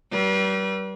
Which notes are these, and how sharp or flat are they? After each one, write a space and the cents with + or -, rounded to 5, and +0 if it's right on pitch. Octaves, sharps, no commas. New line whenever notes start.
G3 -35 B4 -40